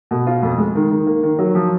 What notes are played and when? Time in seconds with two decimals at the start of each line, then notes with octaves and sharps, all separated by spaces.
0.11 B2
0.27 F4
0.43 F2
0.58 G#3
0.75 D#3
0.91 D#3
1.07 A#3
1.23 D#3
1.39 F#3
1.55 F3